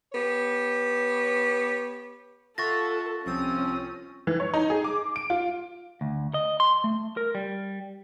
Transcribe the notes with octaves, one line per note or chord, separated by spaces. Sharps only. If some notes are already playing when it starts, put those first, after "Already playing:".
B3 G4 C#5
F4 A4 E5 F#5 C#6 A6 A#6
C2 F3 C4 C#4 D#6
E3
C#5
D#4
G#4
D6
D7
F4
D2
D#5
C6
A3
A#4
G3